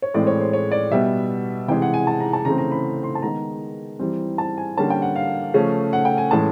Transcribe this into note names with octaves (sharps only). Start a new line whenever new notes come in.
C#5
A2 E3 G#3 C4 D5
C#5
C5
C#5
D5
B2 G3 B3 E5
C3 E3 G#3 G5
F#5
G#5
A5
A#5
A5
C#3 E3 A3 C4 A#5
A#5
B5
C6
A5
D#3 G#3 B3 A#5
E3 G3 C4
A5
G#5
D3 G3 A#3 C#4 A5
G5
F#5
F5
C#3 F3 A3 C#4
F#5
G5
G#5
A2 E3 G#3 C#4 A5